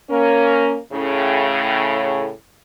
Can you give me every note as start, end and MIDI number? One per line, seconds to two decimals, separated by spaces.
0.10 0.78 58
0.10 0.78 61
0.10 0.78 70
0.92 2.31 45
0.92 2.31 49